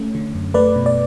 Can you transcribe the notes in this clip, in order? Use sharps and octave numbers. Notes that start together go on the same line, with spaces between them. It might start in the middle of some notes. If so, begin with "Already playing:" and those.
Already playing: A3 C#4
D3
F#2
A3 B4 D5
B2
D5